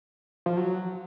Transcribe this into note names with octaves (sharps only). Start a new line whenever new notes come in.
F3
F#3